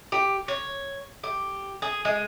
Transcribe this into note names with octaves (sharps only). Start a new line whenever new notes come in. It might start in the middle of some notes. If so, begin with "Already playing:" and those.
G4
C#5
G4
G#4
G#3